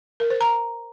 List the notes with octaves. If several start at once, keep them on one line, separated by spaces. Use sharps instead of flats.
A#4
C5
A#5